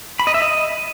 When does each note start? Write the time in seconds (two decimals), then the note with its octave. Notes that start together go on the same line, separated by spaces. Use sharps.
0.20 B5
0.27 D#5
0.34 E5
0.42 D#5